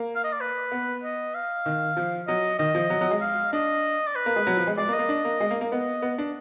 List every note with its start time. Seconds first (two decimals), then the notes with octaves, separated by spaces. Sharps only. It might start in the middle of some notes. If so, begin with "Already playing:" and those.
Already playing: A#3
0.15 F5
0.24 D#5
0.33 D5
0.41 B4
0.72 B3
1.04 D#5
1.35 F5
1.66 D#3
1.97 F3
2.28 F#3 D#5
2.59 D#3 D#5
2.75 F3
2.90 F#3
3.01 F#3
3.11 G#3
3.21 F5
3.53 D4 D#5
4.07 D5
4.16 B4
4.26 A#3
4.36 G#3
4.47 F#3
4.57 F3
4.67 G#3
4.78 G#3 D5
4.88 A#3
4.93 D#5
4.99 A#3
5.09 D4
5.25 A#3
5.40 G#3
5.51 A#3
5.61 A#3
5.71 B3 D#5
6.02 B3
6.18 D4